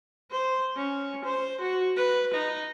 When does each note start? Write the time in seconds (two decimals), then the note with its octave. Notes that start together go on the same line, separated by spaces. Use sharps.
0.31 C5
0.77 C#4
1.25 C5
1.61 F#4
1.96 B4
2.34 D#4